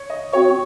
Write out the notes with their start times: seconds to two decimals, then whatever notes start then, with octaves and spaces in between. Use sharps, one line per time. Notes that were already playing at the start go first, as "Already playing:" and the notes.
Already playing: C#5
0.10 D#5
0.33 C4 F#4 C#5